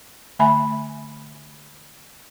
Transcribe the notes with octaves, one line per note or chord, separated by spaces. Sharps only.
D3 A3 E5 G#5 B5